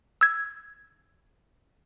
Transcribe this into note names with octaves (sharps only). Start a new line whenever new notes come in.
E6 G#6